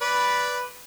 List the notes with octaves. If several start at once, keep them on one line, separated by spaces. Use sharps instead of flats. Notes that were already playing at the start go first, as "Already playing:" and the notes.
B4 D5 B5